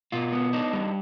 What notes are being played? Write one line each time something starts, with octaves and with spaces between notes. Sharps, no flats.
B2 F4
B3
D4 D#4
G3